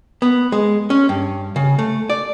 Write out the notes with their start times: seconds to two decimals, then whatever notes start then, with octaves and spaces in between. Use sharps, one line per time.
0.22 B3
0.52 G#3
0.90 C#4
1.09 G2
1.56 C#3
1.79 A3
2.10 D5